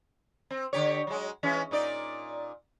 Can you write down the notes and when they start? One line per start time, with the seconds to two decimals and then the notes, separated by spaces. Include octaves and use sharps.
0.50 C4
0.73 D3 G4 C#5
1.07 F#3 G#3
1.43 E3 G#3 C#4
1.71 A#2 D#4 D5